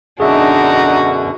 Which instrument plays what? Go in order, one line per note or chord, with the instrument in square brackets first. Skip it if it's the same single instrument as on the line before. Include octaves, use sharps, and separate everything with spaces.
[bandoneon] F#2 B2 D3 [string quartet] D4 D#4 [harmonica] F#4 [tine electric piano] G#4 E5